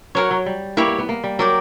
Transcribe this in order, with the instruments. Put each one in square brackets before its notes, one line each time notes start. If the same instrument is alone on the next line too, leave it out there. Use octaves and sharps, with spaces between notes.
[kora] F#3 [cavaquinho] F#4 A#4 C#5
[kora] F#3
G3
[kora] A#3 [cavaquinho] E4 G4 C#5
[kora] B3
B3
A#3
G3
[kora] F#3 [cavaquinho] A#4 D5 G5